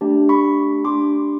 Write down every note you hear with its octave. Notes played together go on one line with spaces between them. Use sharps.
A3 D4 G4
B5 C#6
A3 D4 G4 C6 D6